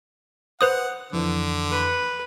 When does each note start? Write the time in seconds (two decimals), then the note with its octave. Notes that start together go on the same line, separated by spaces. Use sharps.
0.61 B4 C5 F#5 D#6
1.13 F2 D3 E3
1.72 B4